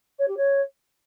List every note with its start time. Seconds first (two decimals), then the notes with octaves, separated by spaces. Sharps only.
0.18 C#5
0.28 G4
0.37 C#5